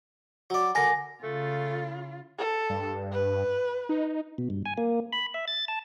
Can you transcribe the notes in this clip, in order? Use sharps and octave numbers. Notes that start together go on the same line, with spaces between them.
F#3 D5
D3 A#4 G#5 A#6
C#3 A3 F4
A4
G2
B4
D#4
B2
G2
G#5
A#3
B5
E5
A6
A5